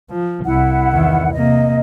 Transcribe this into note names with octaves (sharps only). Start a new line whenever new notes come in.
F3
C2 E4 F#5
E2 D#3
C3 A#3 D#5